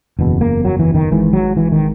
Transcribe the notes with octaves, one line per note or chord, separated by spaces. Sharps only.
F#1 E2 B2
A#3
F#3
E3
D#3
G#1 G#2 E3
F#3
E3
D#3